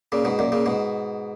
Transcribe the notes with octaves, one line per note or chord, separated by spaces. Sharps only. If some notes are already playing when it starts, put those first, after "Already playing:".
A#2 C#3
G#2 B2
F#2 A#2
A#2 C#3
G#2 B2